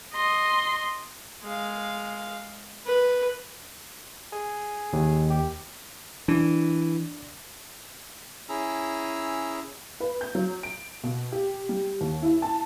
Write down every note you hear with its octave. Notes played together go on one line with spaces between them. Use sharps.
D#5 C6
G#3 F5
B4
G#4
D#2
G4
E3 D4
C#4 E4 G#4 A#5 E6
B4
G6
F#3
D7
B2
G4
G3
D#2
E4
A5